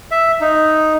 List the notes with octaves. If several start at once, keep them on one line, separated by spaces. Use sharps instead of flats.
E5
D#4